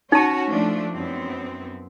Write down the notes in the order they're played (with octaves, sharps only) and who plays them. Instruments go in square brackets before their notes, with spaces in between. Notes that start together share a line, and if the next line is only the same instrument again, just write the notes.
[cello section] C#4 F#4 C#5 [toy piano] D#4 A5
[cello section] F3 A3 D4
F#2 B3 C4